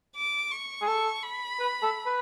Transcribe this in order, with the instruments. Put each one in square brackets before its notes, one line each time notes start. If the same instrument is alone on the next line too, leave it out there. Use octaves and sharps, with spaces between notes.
[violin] D6
C#6
[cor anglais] G#4
[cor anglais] A4 [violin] C#6
[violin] B5
[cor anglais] B4
A4
B4